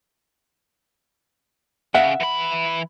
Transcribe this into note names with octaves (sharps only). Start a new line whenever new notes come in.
C#3 E5 F#5
E3 B5